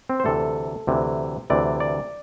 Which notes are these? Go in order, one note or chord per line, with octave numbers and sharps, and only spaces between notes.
C4
C5
D2 C3 E3 A4
D2 C3 E3
D2 C3 E3 D5
D5